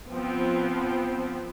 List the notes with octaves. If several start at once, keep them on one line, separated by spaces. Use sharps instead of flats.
F3 B3 C4